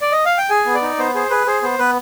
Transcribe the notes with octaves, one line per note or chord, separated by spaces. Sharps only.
D5
D#5
F5
G5
G#4 G#5
B3
D5
D#4
B3 C5
G#4 C5
G#4 B4
G#4 C5
B3 C5
B3 B4